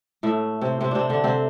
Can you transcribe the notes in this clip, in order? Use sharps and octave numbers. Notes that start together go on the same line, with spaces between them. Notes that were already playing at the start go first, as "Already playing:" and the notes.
A2 A3
C3 C4
C3 C4
C3 C4 D4
D3 D4
C3 C4